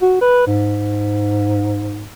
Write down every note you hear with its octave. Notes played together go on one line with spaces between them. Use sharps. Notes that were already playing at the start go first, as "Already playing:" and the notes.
F#4
B4
G#2